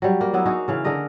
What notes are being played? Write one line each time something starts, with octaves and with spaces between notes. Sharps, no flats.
F#3 G3
A#3
F#3 B3 E4
A#3 D#4 F#4 G#4
C#3 E3 F5
D3 G#4 A#4 D#5